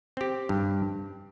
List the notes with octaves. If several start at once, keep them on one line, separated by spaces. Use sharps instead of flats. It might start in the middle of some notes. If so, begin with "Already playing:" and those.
C4 G4
G2